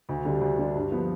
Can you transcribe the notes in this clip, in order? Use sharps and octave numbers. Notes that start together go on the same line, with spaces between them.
D2
D3 G3 D4
D2
D3 G3 D4
G2
F3 B3